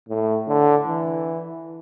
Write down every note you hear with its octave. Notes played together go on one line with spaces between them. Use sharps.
A2
D3
E3